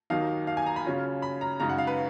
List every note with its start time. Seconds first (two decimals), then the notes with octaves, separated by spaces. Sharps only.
0.10 D#2 D#3 F#3 A#3 D#4 F5
0.47 F5
0.57 G#5
0.66 A#5
0.76 B5
0.85 C#3 F#3 C#4 F4
1.22 B5
1.41 A#5
1.60 F#2 C#3 G#3 D#4 A#5
1.69 F#5
1.78 F5
1.87 B4